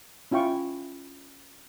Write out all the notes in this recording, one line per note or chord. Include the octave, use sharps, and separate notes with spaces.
C#4 E4 F4 G5 C#6